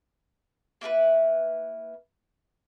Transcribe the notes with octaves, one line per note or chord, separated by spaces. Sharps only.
A#3 E4 A#4 B4